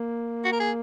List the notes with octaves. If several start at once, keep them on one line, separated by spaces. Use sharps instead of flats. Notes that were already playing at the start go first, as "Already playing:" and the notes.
Already playing: A#3
F#4
A#4
G#4